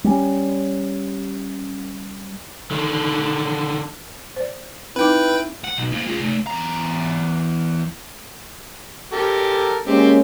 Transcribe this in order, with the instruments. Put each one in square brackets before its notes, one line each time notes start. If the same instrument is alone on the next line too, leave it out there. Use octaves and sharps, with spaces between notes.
[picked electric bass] G3 C#4
[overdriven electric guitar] D3 D#3
[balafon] C5 D5
[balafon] C4 D#4 D6 [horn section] E4 [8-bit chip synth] B4 G5
[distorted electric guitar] F#5
B1
A#3 E4
F4 G#4
C3 A3
[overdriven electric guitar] E2 A#5
[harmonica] G4 A4 A#4
[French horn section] G#3 A#3 C#4 [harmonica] C4 G4